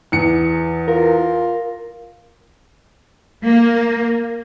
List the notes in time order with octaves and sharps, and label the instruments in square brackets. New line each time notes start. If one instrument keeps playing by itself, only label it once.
[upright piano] E2 C#7
[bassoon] F4 [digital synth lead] A#4
[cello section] A#3